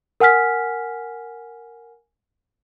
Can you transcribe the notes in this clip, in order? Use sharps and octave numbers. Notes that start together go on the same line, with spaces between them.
A#4 F#5 G#5 F6 B6